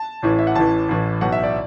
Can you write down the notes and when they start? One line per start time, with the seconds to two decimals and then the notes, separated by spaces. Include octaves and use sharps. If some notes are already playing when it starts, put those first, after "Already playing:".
Already playing: A5
0.22 A1 A2 E3
0.39 E5
0.47 F#5
0.55 A1 A2 E3 A5
0.88 A1 A2 E3
1.21 B1 B2 F#5
1.32 E5
1.44 D5